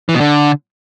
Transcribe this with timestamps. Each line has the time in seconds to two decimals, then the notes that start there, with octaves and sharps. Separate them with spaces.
0.09 E3
0.15 B2
0.20 D3